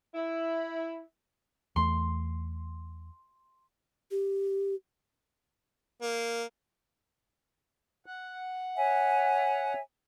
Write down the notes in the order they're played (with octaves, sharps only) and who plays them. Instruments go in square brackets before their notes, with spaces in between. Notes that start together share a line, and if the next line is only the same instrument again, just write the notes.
[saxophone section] E4
[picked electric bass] E2 A3 [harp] C6
[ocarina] G4
[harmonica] A#3
[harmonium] F#5
[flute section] C#5 E5 G#5